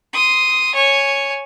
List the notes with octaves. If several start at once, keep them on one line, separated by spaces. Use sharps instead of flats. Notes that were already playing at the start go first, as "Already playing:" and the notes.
C6 D#6
C#5 G#5